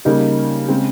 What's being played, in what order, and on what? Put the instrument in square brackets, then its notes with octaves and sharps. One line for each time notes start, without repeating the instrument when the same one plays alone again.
[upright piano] C#3 G3 A#3 D#4
C#3 G#3 C4